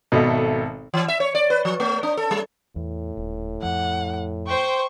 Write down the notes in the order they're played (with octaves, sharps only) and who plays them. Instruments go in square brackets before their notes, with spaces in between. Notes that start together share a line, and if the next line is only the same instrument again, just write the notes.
[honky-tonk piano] G#1 A4 E5 [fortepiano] B2
[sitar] E3
E5
C#5
D5
B4
F3
A3
D4
A4
G3
[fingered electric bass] E2 [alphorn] A2
[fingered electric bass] D#1
[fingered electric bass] F2 F3 [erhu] F#5
[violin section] C5 G5 [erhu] C#6